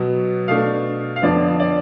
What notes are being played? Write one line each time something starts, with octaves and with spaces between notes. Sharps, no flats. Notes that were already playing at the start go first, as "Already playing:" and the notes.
Already playing: B2 F#3 B3
B2 A3 D4 F5
F5
F2 D3 F3 B3 D5
D5